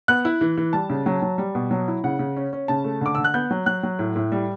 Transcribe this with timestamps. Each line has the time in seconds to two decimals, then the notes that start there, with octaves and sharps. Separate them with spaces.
0.08 B3 F#6
0.25 E4
0.41 E3
0.57 E3
0.73 G3 A5
0.90 C#3
1.06 F#3
1.22 F#3
1.38 G3
1.55 B2
1.71 F#3
1.88 E4
2.04 C#3 F#5
2.19 C#3
2.37 C#4
2.53 C#4
2.68 C#3 A5
2.84 A3
3.01 D3 D6
3.15 D3 E6
3.24 F#6
3.34 B3 G6
3.51 F#3
3.66 F#3 F#6
3.83 F#3
3.99 A2
4.16 A2
4.32 G3